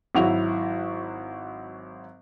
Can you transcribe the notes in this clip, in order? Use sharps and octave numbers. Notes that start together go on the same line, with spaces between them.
G#1 F#3 E4 F#4 F7